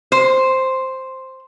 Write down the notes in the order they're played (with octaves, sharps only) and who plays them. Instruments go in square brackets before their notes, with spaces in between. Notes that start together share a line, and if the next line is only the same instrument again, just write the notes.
[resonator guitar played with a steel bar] C5